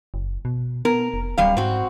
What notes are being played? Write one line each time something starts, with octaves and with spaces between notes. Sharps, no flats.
F#1
B2
B3 A#4
F1
D1 F#2 G3 F5
G#2 C4 F#4